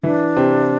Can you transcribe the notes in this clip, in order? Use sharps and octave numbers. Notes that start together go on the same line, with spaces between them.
E3 D4 E4
C3 C4